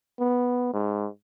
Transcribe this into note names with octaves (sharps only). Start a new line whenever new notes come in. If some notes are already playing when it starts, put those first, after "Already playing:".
B3
G#2